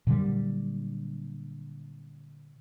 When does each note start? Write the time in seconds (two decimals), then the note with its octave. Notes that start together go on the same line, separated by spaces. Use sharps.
0.07 A#2 D3 F#3 G3